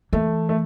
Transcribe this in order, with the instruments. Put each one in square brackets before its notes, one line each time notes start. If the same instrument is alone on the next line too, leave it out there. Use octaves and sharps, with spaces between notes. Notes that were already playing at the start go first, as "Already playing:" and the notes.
[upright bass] E3 [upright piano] A3
[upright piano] A3